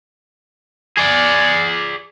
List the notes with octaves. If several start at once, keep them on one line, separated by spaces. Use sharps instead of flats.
G#4 D5